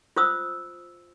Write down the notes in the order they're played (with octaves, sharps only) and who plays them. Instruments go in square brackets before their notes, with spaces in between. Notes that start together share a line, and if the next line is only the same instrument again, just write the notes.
[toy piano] F4 C5 D#6 E6